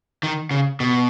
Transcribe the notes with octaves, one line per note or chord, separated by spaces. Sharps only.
D#3
C#3
B2